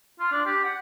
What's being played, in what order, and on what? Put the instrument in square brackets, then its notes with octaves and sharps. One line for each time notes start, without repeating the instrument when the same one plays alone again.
[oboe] F4
D4
G4
F#5